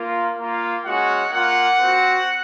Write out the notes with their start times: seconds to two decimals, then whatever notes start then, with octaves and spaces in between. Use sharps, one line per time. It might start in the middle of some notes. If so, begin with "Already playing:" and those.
Already playing: A#3 F4
0.38 A#3 F4
0.85 G#3 C#4 F#4 F#5
1.33 A#3 F4 F#5
1.80 C4 F#4